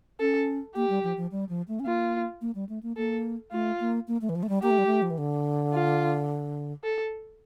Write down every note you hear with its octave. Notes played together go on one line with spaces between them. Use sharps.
C#4 A4
A#3 G4
G3
F3
F3
G3
F3
A3
C#4
A#3 F4
A#3
G3
A3
A#3
A#3 A4
A3 F4
A#3
A#3
A3
E3
F3
A3
G3
A#3 G4
A3
G3
A3
F3
E3
D3
F4
A4